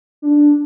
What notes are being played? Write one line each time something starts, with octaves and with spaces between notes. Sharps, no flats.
D4